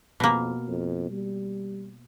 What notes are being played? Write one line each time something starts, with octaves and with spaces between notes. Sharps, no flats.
F2 B2 A#3
F2
G3